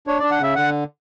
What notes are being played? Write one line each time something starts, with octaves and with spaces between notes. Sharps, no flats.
D4 C#5
D4 D5
F#5
C#3 E5
D3 F#5